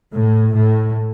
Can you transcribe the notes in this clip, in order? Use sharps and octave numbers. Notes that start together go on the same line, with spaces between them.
A2
A2